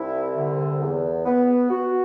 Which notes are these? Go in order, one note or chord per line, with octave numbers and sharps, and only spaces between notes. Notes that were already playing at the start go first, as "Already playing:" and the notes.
Already playing: C2 E4
D3
E2
B3
F#4